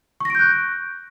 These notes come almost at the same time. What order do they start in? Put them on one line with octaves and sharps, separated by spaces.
C#6 A#6 D7 G6 F#6